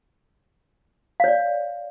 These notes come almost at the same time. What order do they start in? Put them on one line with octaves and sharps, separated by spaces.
F5 C#5 D5